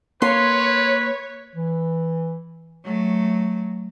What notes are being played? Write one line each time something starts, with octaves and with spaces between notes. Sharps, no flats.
A#3 B4 C#5 C6
E3
F#3 A3